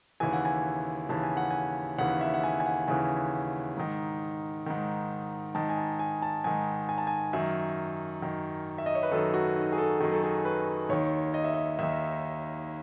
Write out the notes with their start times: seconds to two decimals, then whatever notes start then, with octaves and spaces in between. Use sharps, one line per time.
0.20 D#2 C#3 E3 G#5
0.33 F#5
0.45 G#5
1.09 D#2 C#3 E3 A5
1.23 G#5
1.37 F#5
1.50 G#5
1.98 D#2 C#3 E3 F#5
2.21 E5
2.34 F#5
2.44 G#5
2.60 G#5
2.66 F#5
2.88 D#2 C#3 E3 G#5
3.77 G#2 D#3
4.66 G#2 D#3
5.55 G#2 D#3 A5
5.69 G#5
5.78 A5
5.99 G#5
6.22 A5
6.44 G#2 D#3 G#5
6.89 G#5
6.98 A5
7.07 G#5
7.33 F#2 D#3 E5
8.22 F#2 D#3
8.78 E5
8.86 D#5
8.95 C#5
9.03 B4
9.12 F#2 D#3 A4
9.34 F#4
9.56 D#4
9.72 G#4
9.78 A4
10.00 F#2 D#3 G#4
10.12 A4
10.24 G#4
10.45 B4
10.89 D#2 D#3 C#5
11.34 D#5
11.44 E5
11.54 D#5
11.79 D#2 D#3 E5